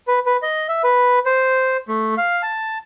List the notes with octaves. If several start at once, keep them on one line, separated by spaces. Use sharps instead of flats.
B4
B4
D#5
E5
B4
C5
A3
F5
A5